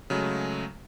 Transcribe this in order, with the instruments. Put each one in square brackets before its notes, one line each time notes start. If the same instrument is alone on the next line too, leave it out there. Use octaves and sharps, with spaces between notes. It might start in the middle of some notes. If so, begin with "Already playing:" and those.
[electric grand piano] C#3 F#3 G#3 A3